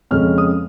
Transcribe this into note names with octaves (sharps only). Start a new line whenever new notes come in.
F2 C#3 G#3 C#4 F6
D#6